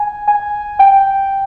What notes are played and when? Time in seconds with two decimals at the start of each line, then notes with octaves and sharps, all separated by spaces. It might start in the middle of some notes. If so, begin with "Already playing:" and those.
Already playing: G#5
0.28 G#5
0.79 G5